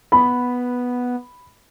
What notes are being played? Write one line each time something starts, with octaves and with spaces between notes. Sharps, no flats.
B3 B5